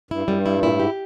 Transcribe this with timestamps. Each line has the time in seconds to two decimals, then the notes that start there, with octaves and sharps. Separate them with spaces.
0.11 G2 E4
0.22 F#2
0.28 G3
0.34 G2
0.46 E4
0.58 A#2
0.63 A2 E4
0.77 G#2 G4